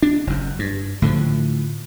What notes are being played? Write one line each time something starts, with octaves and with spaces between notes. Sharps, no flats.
D4
F#1 F#2
G2
A2 D3 D#3 F3